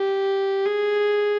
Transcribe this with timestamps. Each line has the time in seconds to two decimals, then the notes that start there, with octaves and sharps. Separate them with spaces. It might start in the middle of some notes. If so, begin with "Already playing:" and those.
Already playing: G4
0.65 G#4